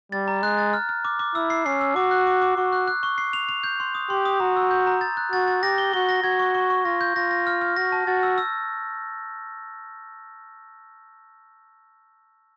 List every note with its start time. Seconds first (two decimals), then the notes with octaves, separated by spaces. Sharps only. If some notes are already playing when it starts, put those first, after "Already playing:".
0.12 G3 A6
0.28 A#5
0.43 G#3 F#6
0.58 A6
0.74 F6
0.89 F6
1.05 D6
1.19 D6
1.35 E4 E6
1.50 C7
1.66 C#4 C7
1.81 E6
1.96 F#4 D6
2.11 F#6
2.27 D6
2.42 D6
2.57 F#4 C#6
2.73 F#6
2.88 F#6
3.03 C#6
3.18 C7
3.33 F7
3.49 F7
3.64 G6
3.80 C6
3.95 D#6
4.10 G4 C6
4.25 D#6
4.40 F#4 A#5
4.56 E6
4.71 G6
4.87 A#5
5.01 A6
5.17 F#6
5.32 F#4 A6
5.48 A6
5.63 G4 A#6
5.78 G7
5.93 F#4 G7
6.09 A#6
6.23 F#4 G#6
6.39 C#6
6.55 C#6
6.70 C#6
6.85 F4 A#6
7.01 G6
7.16 F4 A#6
7.31 A#6
7.47 F6
7.62 F6
7.76 F#4 A#6
7.92 A5
8.07 F#4 A6
8.23 E6
8.38 E6